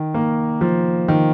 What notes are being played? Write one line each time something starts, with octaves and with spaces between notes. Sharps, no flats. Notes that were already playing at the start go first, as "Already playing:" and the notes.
Already playing: D#3
A#3
F3
D#3